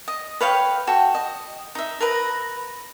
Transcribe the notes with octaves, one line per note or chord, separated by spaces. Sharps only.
D#5
B4 C#5 F5 G5
F#4 A4 G5
D#5
D#4 E5
A#4 B4 A#5